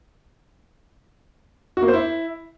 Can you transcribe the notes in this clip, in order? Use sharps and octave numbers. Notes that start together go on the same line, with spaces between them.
F#4
A#3
C5
E4